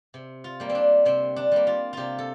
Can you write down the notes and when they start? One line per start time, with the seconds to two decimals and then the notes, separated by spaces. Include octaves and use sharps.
0.14 C3
0.44 F4
0.60 G3 A#3
0.69 C4
0.75 D4
1.05 C3 C4
1.36 D4
1.51 G3 A#3
1.67 F4
1.93 C3 F4 G4
2.18 A4